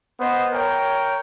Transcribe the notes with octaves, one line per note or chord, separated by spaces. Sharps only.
B3 C5 D#5
A#4 C#5 G5